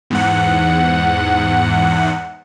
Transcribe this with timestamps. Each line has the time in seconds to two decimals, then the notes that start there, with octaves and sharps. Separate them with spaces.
0.10 E2 G#2 F#5